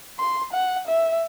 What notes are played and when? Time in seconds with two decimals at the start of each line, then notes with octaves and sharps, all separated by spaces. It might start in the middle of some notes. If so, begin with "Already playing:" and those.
0.19 C6
0.53 F#5
0.87 E5